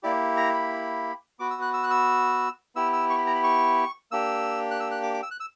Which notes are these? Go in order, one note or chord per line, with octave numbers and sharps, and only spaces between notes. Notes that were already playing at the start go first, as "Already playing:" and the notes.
A#3 E4 G4 D5
A#5
B5
B3 F#4 D6
E6
F#6
E6
F#6
E6
B3 E4 G4 E6
E6
C#6
B5
A#5
B5
C#6
A#3 D4 G4 E6
F#6
E6
F#6
D6
D6
E6
F#6
E6